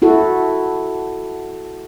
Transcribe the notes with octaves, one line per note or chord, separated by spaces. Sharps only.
E4 F#4 A4